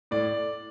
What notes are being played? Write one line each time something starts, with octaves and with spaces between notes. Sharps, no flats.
A2 D5